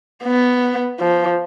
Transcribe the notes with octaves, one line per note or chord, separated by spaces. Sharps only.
B3
F3